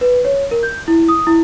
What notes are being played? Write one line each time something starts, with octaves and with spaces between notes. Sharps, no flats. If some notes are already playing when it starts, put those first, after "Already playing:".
B4
C#5
A#4
G6
E4
D#6
E4